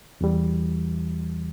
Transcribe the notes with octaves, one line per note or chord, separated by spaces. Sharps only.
E2 E3 G3